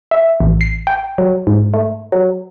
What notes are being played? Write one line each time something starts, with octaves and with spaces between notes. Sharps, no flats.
E5
A1
C7
G5
F#3
G#2
A3
F#3